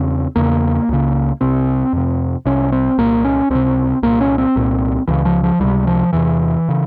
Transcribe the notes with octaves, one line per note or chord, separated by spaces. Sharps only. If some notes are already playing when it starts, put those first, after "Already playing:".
Already playing: E2 C#3 C4
E2 C#3 A#3
C#2 C#3
C2 C3 C4
F2 C3
C2 C3 C#4
C4
C2 A#2 A#3
C#4
C#2 C3 C4
C2 A#2 A#3
C#4
C4
C2 A#2
C#2 C#3 E3
F3
F3
C#2 C3 G3
F3
E2 C3 E3
C#3